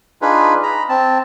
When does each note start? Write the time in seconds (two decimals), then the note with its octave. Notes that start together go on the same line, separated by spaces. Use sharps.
0.22 D4 D#4 F4 G#4 B4
0.63 A#5 B5
0.89 C4 A5